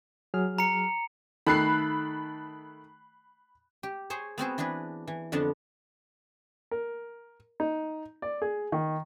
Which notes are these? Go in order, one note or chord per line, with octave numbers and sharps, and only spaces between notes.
F#3 G#4 F6
A#5 C#7
D#3 A3 A4 B5 F#6 C7
G4
G#4 C5 C#5
B3 C4 F#4 G#4
E3 D4 G#4 B4
E3
F2 D3 B3 D4 F#5 A5
A#4
D#4
D5
G#4
D#3